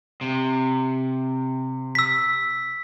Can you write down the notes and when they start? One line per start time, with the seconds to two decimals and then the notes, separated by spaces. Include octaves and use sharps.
0.21 C3
1.95 E6 B6